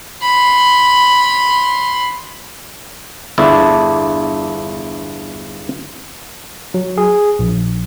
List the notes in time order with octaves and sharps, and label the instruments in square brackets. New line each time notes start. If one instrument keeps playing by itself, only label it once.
[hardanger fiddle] B5 C6
[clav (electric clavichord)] G1 E2 D4 E4 A4 A5
[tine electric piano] F#3
G#4
A#1